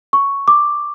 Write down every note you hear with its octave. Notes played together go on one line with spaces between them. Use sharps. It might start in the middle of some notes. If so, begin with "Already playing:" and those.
C#6
D6